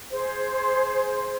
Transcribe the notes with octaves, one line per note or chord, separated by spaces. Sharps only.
G#4 C5